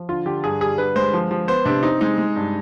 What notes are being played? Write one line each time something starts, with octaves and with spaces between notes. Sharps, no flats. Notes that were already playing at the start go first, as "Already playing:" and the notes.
Already playing: F3
D3 F4
D3 G4
G2 G#4
G3 G#4
D3 B4
G#3 C5
F3
F3
B3 C5
C3 D4
C4 D#4
G#3 D#4
G#3
G2